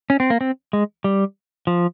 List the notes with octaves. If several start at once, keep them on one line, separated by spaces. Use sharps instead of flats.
C#4
C4
A#3
C4
G#3
G3
F3